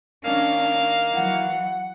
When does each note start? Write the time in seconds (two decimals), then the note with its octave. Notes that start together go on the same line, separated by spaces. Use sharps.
0.25 D#3 A#3 C#4 D4 F5
1.14 E3 F#3 F#5